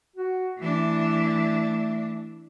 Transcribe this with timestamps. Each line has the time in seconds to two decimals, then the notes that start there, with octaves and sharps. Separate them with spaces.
0.16 F#4
0.59 E3 A3 D4